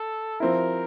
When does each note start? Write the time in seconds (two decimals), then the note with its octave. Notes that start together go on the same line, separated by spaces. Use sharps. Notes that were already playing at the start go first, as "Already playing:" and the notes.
Already playing: A4
0.40 F3 C4 E4 A#4